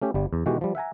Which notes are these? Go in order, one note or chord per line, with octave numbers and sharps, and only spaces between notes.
A3 C#4 G4
G1 G3
E2
B2 D#3 E3 G#3 F#4 G4
F3 G3
E5 F#5 G#5 A#5